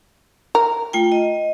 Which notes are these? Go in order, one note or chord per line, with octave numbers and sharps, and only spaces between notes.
A#4
A3 F4 G5
D#5